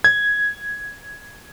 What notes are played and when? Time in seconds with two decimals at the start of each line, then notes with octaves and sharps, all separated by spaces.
0.04 G#6